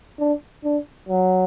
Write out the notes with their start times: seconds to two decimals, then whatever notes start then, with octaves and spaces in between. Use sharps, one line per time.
0.19 D4
0.64 D4
1.08 F#3